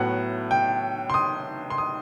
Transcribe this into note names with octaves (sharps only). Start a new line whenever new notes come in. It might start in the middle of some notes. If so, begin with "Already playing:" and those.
Already playing: A2 F#3 B3 F#5
G5
C6
D#6
C6
D#6